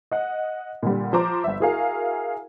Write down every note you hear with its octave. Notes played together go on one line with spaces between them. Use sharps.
D#5 F#5
A#2 D3 G3
F3 C5 A#5 D6
G1 E5
E4 F#4 G#4 A#4 F5